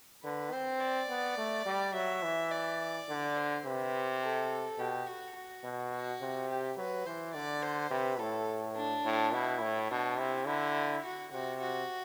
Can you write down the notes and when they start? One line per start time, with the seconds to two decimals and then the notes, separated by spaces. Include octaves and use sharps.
0.23 D3 B4
0.52 C4 C5
0.80 D5
1.09 B3
1.38 A3
1.66 G3
1.94 F#3 E5
2.23 E3
2.51 D5
3.09 D3
3.37 C5
3.65 C3 B4
4.22 A4
4.79 B2 G4
5.07 F#4
5.35 F#4
5.64 B2
5.92 F#4
6.21 C3
6.50 G4
6.77 F#3 B4
7.06 E3 C5
7.34 D3 D5
7.63 C5
7.91 C3 B4
8.19 A2 A4
8.76 D4
9.05 A2
9.33 B2 E4
9.61 A2
9.91 B2 D4
10.18 C3 E4
10.47 D3 E4
11.04 F#4
11.32 C3 F#4
11.60 F#4